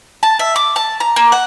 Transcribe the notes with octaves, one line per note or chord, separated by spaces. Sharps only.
A5
E5
D6
A5
A#5
A#3
F#5